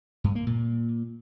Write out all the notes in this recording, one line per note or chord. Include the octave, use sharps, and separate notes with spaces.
G2
A#3
A#2